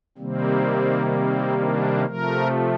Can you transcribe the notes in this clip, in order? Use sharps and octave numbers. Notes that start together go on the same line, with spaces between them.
C3 D#3 G3 A#3 C4
C4
D4
C3 F3 A3 A#4